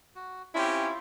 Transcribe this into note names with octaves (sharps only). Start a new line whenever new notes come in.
F#4
C4 C#4 E4 F4 G4